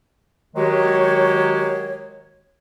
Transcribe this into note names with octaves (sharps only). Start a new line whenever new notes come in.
D#3 F#3 G#3 F#4 G4 C#5